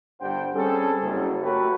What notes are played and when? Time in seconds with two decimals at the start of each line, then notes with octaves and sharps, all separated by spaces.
0.21 G1 G2 C5 F#5 G5
0.54 G3 C4 C#4 G#4 A4
1.02 F#1
1.42 A3 F#4 G4 A#4 B4 C#5